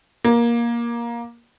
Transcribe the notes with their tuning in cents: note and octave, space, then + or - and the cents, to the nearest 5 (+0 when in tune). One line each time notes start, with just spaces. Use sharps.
A#3 +15